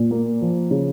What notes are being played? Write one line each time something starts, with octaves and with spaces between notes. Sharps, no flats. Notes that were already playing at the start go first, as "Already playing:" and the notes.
Already playing: A#2
A#3
F3
C#3